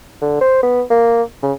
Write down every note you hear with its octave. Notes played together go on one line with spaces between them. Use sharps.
D3
C5
B3
A#3
C#3